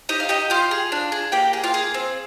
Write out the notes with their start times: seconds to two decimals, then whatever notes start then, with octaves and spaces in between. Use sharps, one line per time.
0.09 D#4 G4 D#5
0.20 F5
0.29 D#4 G4 D#5
0.50 F4 G4 F5
0.71 G#4
0.92 D4
1.12 G#4
1.32 A#3 G4 G5
1.53 G#4
1.64 F4 F5
1.74 G#4
1.94 C4